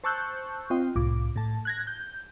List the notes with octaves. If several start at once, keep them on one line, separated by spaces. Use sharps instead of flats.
C5 A5 C#6 E6 F#6 G6
C4 F4 C5 D#5 G5
C2 A2 F4 D6
A2 A5
F#6 G#6 A#6
G6